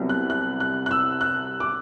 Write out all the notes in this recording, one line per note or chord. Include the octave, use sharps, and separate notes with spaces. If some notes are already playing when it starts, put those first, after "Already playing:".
Already playing: C2 C3 F#3 B3 E4
F#6
F#6
F#6
F#6
E6
F#6
D6